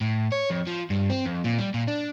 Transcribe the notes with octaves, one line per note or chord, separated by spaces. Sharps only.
A2
C#5
F2
F3
G2
C4
F2
A#2
G3
A#2
D4